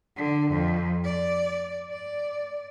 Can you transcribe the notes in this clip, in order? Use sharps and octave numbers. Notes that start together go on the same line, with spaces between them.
D3
F2
D5
D5